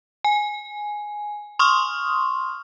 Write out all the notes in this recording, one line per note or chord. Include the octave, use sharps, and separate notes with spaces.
G#5
C6 C#6 D#6 F6